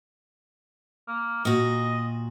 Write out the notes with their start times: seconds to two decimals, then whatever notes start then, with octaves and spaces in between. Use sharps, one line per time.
1.08 A#3
1.45 A#2 F#4 D#5